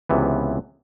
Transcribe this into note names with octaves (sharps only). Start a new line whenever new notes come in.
C#2 C3 E3 B3